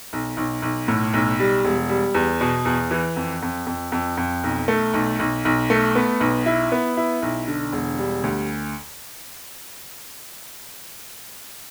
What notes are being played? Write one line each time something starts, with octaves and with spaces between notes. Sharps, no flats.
B1
B1
B1
A2
B1
G3
E1
G3
E2
B2
E2
E3
F2
F2
F2
F2
F2
B1
A3
B1
B1
B1
A3
B3
B1
E4
B3
E4
B1
D3
E1
G3
D2